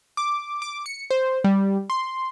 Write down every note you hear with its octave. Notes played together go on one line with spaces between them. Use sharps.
D6
D6
C#7
C5
G3
C6